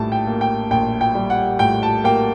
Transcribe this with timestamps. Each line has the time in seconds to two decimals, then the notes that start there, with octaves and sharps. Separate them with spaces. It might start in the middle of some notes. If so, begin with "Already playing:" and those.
Already playing: A#1 A2 G3 A5
0.12 G5
0.27 A#3
0.41 G5
0.71 A#1 G5
1.01 G5
1.15 G3
1.30 F#5
1.59 A2 G5
1.83 A5
2.04 A#3 G5